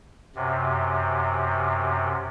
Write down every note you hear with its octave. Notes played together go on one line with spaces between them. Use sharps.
F#2 C3